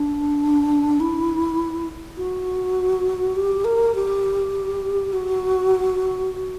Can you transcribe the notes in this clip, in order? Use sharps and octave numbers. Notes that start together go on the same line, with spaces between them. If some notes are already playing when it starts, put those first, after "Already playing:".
Already playing: D4
E4
F#4
G4
A#4
G4
F#4